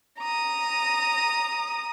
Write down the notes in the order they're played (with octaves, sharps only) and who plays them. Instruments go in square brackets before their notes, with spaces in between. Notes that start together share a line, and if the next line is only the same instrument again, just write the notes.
[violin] A#5 D#6